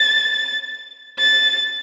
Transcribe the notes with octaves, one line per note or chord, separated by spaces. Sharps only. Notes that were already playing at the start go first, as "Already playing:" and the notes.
Already playing: A6
A6